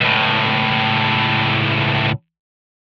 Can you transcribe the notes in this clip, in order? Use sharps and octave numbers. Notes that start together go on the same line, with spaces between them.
C#2 A2